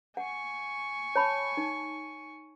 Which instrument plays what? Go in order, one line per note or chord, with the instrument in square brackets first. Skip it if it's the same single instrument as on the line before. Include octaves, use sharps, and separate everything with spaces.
[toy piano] F#5 [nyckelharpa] G#5 C#6
[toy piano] C#5 A5 B5
D#4